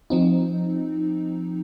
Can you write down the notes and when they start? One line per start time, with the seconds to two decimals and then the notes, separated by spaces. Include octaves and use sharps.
0.10 F3 C4 D#4